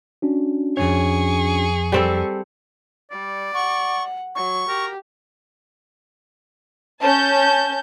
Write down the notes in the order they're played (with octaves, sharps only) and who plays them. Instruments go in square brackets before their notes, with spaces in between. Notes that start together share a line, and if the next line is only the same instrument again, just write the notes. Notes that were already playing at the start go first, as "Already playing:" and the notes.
[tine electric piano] C#4 D4 F#4
[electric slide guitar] F2 G#2 C#5 [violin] G#4 C#6
[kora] G3 C4 A4
[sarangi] G3 [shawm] D5
[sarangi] F#5 [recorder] C#6
[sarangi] F#3 [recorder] C#6
[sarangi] G4 [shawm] A#4
[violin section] C#4 A5 G6